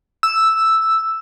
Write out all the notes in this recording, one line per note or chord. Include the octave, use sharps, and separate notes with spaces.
E6